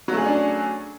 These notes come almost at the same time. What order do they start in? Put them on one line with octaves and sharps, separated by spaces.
F#3 A3 G#4 C#4 D4